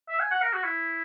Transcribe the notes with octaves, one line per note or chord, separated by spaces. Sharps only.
E5
G#5
F#5
A#4
F#4
E4